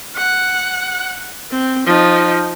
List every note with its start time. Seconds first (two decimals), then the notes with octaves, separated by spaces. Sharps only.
0.16 F#5
1.51 C4
1.86 F3 D#4